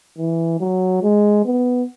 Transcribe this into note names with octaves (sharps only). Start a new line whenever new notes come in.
E3
F#3
G#3
B3